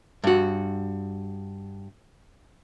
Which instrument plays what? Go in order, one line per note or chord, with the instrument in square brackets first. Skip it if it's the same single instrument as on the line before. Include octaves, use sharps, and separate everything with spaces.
[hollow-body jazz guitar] G2 F#4